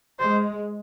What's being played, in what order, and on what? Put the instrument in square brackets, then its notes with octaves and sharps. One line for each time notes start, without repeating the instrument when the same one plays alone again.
[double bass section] G#3 [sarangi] C5